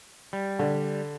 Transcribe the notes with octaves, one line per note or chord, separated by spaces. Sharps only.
G3
D3